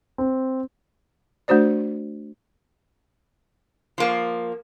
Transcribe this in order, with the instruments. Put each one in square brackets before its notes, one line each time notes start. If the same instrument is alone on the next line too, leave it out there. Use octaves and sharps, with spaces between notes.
[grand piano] C4
[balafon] A3 D4 F#4 C5 D5
[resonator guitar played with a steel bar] F3 A#3